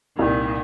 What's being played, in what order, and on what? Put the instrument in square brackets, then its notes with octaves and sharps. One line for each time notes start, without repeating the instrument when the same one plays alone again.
[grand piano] C2 [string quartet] A#2 D#3